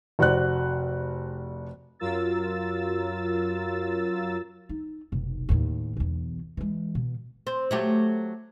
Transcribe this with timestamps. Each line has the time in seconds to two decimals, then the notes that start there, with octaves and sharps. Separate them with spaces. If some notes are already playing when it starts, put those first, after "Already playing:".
0.19 F1 F#4 C5 D5 F#6
1.99 F#2 F#3 F4 A#4 E6 A6
4.69 D#4
5.12 F1 B1
5.49 D#2 A2
5.97 B1 E2
6.57 E3 G#3
6.95 B2
7.47 C4
7.71 F#3 A3 G4